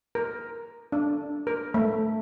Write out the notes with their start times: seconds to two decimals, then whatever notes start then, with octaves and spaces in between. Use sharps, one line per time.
0.15 A#4
0.92 D4
1.47 A#4
1.74 A3